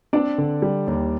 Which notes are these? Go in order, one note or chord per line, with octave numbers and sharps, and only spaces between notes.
C4 D4 D5
D3
G3
D#2